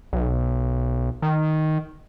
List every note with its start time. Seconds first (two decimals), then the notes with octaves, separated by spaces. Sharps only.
0.13 B1
1.22 D#3